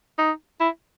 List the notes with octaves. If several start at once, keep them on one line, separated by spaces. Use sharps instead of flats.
D#4
E4